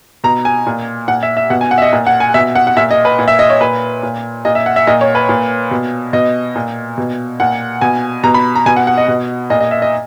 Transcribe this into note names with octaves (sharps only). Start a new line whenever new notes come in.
B2 A#5
G#5
A#2
A#2 F#5
E5
E5
B2 F#5
G#5
F#5
E5
D#5
A#2
F#5
G#5
B2 E5
F#5
F#5
A#2 E5
D#5
B4
A#2
E5
D#5
C#5
A#2 B4
A#2
A#2 D#5
E5
F#5
E5
A#2 D#5
C#5
B4
A#2
B2
B2 D#5
A#2
B2
A#2 F#5
B2 G#5
B2 A#5
B5
A#5
B2 G#5
F#5
F#5
D#5
B2
A#2 D#5
D#5
E5
D#5